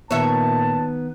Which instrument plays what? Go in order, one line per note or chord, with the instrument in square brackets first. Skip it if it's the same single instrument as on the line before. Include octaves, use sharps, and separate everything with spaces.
[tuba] A#2 [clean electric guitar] D#3 B3 [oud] C#5 E5 [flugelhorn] A5